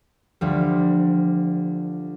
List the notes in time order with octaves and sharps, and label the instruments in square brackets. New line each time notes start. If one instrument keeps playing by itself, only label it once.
[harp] D2 F3 G3